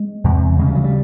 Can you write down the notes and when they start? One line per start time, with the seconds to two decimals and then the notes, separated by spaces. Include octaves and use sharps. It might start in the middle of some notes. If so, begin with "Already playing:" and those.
Already playing: G#3
0.24 E2 C3
0.58 D2 C#3 G#3
0.67 G3
0.75 F#3
0.84 G3